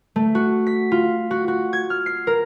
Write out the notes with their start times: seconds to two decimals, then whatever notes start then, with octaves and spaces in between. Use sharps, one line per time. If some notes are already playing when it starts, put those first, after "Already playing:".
0.16 A3
0.35 F#4
0.67 B6
0.92 F4
1.31 F#4
1.48 F#4
1.73 G#6
1.90 F6
2.06 C7
2.27 A#4